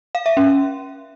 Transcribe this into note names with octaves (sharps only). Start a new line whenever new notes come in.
F5
E5
C#4